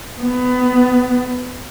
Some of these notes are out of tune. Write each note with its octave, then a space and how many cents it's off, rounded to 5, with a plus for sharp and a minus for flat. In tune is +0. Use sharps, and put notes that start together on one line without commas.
B3 +20